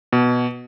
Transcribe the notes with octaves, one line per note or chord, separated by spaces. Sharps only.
B2